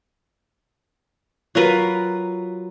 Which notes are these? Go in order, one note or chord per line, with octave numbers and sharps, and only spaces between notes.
F#3 F4 A#4 B4